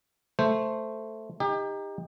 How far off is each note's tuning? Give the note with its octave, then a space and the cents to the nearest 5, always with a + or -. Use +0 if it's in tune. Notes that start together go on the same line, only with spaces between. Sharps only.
A3 +0 C5 -5
D#4 +0 G4 +30